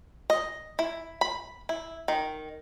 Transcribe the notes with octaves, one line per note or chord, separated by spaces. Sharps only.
D#5
E4
B5
E4
D#3